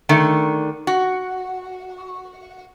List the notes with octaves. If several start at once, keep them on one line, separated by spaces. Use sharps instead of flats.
D3 D#3 A3
F#4